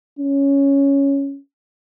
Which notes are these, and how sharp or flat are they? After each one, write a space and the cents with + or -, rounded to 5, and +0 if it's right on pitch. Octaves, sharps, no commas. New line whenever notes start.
C#4 +5